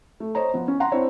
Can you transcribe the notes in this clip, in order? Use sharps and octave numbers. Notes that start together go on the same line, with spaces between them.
A3
C5 C#5 D#5 A#5
F3 B3
C#4
F#5 A#5 C6
C4 D4 E4 C5 C#5